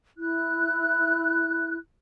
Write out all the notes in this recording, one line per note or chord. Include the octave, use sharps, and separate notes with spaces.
E4 F#6